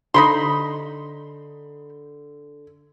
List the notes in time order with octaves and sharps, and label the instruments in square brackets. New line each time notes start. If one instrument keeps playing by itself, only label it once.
[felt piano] D3 [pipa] D#4 B5 C6